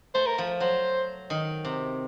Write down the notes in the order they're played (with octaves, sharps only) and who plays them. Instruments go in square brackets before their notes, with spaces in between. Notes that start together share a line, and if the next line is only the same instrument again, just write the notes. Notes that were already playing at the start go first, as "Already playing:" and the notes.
[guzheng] A3 [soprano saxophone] C5
[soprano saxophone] A#4
[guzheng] F3
[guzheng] F#3 [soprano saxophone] C5
[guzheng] D#3
C3